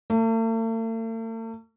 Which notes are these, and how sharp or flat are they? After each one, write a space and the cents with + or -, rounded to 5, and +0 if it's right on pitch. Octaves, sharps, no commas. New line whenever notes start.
A3 +45